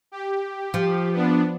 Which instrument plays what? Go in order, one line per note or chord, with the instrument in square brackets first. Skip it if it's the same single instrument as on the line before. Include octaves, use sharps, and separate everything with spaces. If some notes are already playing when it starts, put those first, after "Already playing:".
[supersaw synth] G4
[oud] F3
[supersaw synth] B3 D4